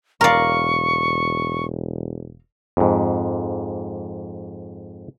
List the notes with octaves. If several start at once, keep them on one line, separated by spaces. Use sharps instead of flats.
E1 A#4 D5 F5 A#5 C#6
F2 G#2